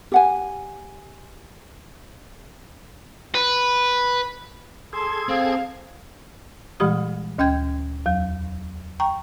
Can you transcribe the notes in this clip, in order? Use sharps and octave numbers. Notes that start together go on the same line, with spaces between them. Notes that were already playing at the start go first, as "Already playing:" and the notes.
G4 F#5 G#5
B4
G#4 A4 A5 C6 G#6
C4 F5
A#2 E3 G3 G#3 G4 D#6
D2 C#4 G5 G6 G#6
E2 F#3
G5 A#5 C#6